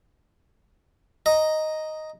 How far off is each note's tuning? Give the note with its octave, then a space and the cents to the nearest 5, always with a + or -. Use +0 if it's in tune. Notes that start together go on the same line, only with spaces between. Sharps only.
D#5 +0 A#5 +0